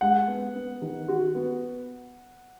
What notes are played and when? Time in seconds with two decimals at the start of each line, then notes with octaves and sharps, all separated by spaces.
0.01 G#3 F#5
0.28 B3
0.55 B3
0.82 D#3
1.08 F#4
1.35 B3